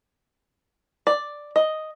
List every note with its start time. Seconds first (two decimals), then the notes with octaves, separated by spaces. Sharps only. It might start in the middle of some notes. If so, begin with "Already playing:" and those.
1.07 D5
1.56 D#5